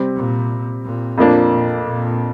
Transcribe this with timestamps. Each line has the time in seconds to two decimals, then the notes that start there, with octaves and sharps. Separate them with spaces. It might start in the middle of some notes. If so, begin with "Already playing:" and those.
Already playing: C3 G3 C4
0.16 A#2
0.84 A#2
1.18 F2 F3 A#3 D4
1.51 A#2
1.85 A#2